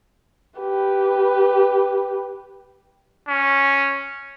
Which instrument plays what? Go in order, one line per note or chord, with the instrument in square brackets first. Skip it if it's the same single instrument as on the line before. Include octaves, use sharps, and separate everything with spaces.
[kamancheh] G4 B4
[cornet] C#4